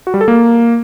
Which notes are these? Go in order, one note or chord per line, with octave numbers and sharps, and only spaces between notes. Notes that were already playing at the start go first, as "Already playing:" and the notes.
F#4
G3
A4
A#3